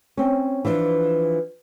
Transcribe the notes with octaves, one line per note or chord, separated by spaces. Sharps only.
C4 C#4
E3 F3 D4